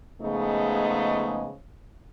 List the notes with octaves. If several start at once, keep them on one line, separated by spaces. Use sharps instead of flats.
C#3 F3 G#3 A3 B3 D#4